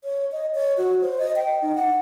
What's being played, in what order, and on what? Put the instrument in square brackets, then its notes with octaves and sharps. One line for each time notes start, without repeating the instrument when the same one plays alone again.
[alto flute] C#5
D#5
C#5
F#4
C5
D#5
G5
D#4
F#5